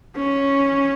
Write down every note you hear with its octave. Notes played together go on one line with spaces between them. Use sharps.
C#4